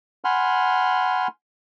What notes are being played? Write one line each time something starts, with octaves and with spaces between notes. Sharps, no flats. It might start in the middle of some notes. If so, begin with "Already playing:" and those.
F#5 G#5 B5 C6 F6